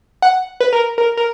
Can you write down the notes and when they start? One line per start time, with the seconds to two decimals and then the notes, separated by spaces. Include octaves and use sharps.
0.22 F#5
0.60 B4
0.73 A#4
0.98 A#4
1.17 A#4